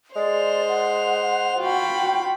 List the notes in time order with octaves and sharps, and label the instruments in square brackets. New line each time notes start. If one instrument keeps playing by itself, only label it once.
[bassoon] G#3 [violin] C5 F7 [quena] D5
[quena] F#5
[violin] F4 B5 [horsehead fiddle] F#4 G5